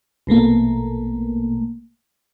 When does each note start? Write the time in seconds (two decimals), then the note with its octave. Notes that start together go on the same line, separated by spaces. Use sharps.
0.27 A#1 B2 A3 A#3